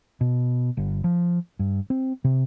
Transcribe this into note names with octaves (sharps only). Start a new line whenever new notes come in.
B2
G1
F3
G2
C4
C3